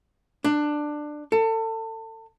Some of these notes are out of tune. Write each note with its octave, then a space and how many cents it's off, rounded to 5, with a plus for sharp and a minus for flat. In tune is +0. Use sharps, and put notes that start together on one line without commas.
D4 +15
A4 +30